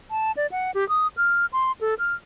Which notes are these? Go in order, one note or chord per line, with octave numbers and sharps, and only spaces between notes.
A5
D5
F#5
G4
D#6
F6
C6
A4
F6